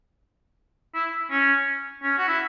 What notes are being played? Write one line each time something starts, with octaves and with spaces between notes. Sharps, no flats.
E4
C#4
C#4
F#4
E4